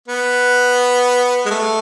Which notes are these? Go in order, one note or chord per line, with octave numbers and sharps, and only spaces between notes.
B3
G#3
A3